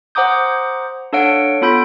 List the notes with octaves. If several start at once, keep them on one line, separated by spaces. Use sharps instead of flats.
C5 F#5 A#5 D6 D#6 G6
D4 A4 C#5 F5 F#5 D7
B3 F4 A4 B5 G6 D7